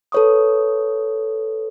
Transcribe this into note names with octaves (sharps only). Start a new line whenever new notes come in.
A4 B4 C#5 C#6 D#6